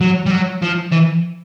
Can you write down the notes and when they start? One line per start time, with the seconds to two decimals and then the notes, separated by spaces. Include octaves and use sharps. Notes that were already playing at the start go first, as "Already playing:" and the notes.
0.01 F#3
0.26 G3
0.31 F#3
0.62 F3
0.92 E3